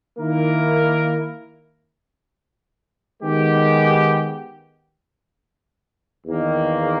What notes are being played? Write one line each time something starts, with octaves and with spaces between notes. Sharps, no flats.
D#3 A#3 E4 A#4
D#3 G#3 B3 G4
E2 D#3 A#3